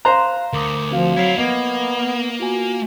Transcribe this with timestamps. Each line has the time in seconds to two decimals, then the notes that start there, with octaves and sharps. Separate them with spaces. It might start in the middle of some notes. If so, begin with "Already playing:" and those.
0.05 C5 F5 A#5 C6 F#6
0.53 D2 A#4 D6 D#6
0.91 F3 C4 F#4 F5
1.16 F#3 E4 F4 G#6 C7
1.37 A#3 B3 D#5 G#6
2.40 F4 F#4 G#5